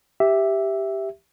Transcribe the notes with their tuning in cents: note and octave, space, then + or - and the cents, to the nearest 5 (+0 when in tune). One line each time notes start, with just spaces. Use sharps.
G4 +0 E5 +0